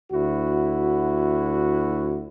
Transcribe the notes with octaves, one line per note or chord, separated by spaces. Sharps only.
D2 E4 F#4